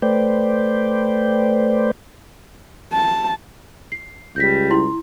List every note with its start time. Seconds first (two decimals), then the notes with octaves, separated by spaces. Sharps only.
0.02 A3 B4 C5 D5 G5
2.93 A5
3.92 C7
4.36 C#2 G3 G6 A#6 B6
4.71 E4 C6